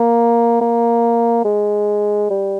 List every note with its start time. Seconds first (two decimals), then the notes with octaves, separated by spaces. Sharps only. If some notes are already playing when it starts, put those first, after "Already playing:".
Already playing: A#3
0.61 A#3
1.45 G#3
2.30 G3